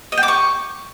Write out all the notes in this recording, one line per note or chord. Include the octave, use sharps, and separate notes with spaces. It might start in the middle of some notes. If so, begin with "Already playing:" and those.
D#5
G5
D6
C#6